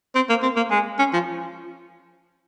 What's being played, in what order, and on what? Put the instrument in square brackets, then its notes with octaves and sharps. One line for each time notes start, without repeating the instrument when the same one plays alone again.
[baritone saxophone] C4
A#3
C4
A#3
G#3
C#4
F3